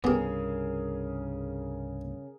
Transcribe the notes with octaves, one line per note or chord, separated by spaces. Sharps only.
C2 G2 C#3 B3 G4 G#4 A#4